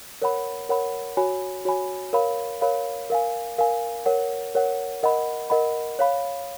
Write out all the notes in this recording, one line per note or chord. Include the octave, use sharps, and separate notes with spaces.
A#4 C#5 F#5 B5
A#4 C#5 F#5 B5
F#4 C#5 G#5 B5
F#4 C#5 G#5 B5
A#4 C#5 F5 B5
A#4 C#5 F5 B5
A#4 F5 G#5
A#4 F5 G#5
A#4 C#5 F#5
A#4 C#5 F#5
A#4 D#5 F#5 B5
A#4 D#5 F#5 B5
C#5 F5 B5